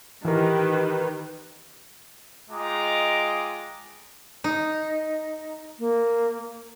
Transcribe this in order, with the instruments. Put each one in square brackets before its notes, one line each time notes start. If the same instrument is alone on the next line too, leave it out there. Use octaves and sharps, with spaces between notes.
[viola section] D#3 G4 B4 [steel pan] E3 A#4
[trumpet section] G#3 F4 D#5 G5 A#5 D6
[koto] D#4
[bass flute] A#3